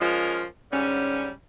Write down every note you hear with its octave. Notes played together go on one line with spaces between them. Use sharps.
F3 G#3 C#4 F4 A#4
G#2 D3 G3 C#4